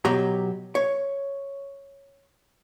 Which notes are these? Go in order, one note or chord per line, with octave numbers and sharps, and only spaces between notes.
B2 F#3 G4 A#5
C#5